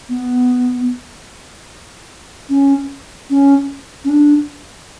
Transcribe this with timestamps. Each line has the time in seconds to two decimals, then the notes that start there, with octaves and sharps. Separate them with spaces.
0.09 B3
2.49 C#4
3.30 C#4
4.04 C#4
4.09 D4